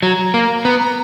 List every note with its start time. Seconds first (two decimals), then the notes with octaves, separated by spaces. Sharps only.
0.03 F#3 A#5
0.34 A#3
0.65 B3